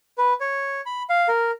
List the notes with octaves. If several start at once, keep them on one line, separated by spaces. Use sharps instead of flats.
B4
C#5
B5
F5
A#4